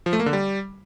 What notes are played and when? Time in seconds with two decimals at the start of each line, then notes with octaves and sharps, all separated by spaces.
0.06 F3
0.13 A3
0.20 A#3
0.26 D3
0.33 G3